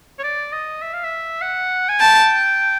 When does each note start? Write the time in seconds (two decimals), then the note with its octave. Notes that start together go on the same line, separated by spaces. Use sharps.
0.19 C#5
0.24 D5
0.53 D#5
0.82 E5
0.94 F5
1.04 E5
1.42 F#5
1.89 G#5
2.01 G5 A5